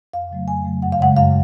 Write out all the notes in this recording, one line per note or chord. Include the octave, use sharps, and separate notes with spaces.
F2 F5
C#3 F#3 A3
F2 G#5
C#3 F#3 A3
F#2 F#5
F5
C#3 G#3 F#5
F#2 F5